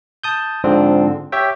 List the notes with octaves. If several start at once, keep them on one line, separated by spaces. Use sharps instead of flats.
A5 D#6 G6
G#2 D3 F3 C4 D4
G4 C#5 E5 G5